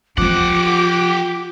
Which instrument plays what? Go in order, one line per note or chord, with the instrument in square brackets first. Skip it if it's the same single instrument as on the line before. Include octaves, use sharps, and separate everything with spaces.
[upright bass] F3 C4 [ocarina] F4 [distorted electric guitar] G4 F#5 [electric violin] D6